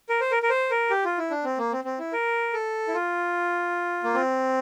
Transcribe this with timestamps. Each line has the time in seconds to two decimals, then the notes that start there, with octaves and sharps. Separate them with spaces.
0.09 A#4
0.21 C5
0.31 A#4
0.43 A#4
0.50 C5
0.71 A#4
0.90 G4
1.05 F4
1.18 E4
1.31 D4
1.44 C4
1.58 A#3
1.72 C4
1.85 C4
1.99 E4
2.13 A#4
2.53 A4
2.88 E4
2.94 F4
4.04 A#3
4.14 C4